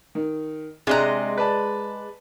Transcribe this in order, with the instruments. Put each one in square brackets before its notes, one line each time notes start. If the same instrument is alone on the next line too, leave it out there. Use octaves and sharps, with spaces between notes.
[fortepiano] D#3
[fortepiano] C3 D4 F#6 [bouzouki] G#3 D#5 A#5
[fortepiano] B4 D5 A5